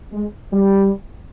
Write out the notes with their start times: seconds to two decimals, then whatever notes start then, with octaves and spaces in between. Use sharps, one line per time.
0.12 G#3
0.52 G3